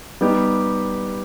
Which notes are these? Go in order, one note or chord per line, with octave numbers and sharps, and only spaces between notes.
G3 B3 D#4 G4